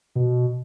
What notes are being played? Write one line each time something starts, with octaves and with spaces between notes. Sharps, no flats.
B2